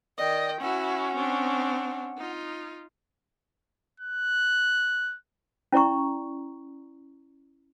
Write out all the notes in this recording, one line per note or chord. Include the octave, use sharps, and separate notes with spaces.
D#3 D5 D#5 G5
C#4 E4 F#4 F#5
C4 D4
D#4 F4
F#6
C#4 E4 D5 A#5 C#6